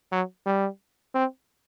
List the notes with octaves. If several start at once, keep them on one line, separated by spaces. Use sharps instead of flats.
F#3
G3
C4